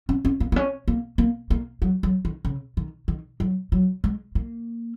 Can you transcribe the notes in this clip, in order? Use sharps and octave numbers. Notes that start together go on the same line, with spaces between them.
C#4
C#4
A#3
A#3
C#4
A#3
A#3
A#3
F#3
F#3
D#3
C#3
D#3
D#3
F#3
F#3
G#3
A#3